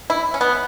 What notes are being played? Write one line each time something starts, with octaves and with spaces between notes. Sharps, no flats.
E4
C#4
B3